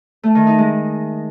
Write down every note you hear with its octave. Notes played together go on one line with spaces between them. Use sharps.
A3
D#3
D#4
G#3